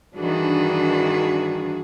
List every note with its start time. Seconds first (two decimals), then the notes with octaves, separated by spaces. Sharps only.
0.16 G2 D#3 E3 D4 F#4 G#4